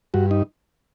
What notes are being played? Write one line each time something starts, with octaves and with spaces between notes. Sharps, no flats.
G2 F#4
D#4